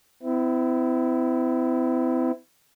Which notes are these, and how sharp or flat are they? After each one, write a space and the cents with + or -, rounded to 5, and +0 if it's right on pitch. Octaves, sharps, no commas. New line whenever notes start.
C4 -45 E4 +0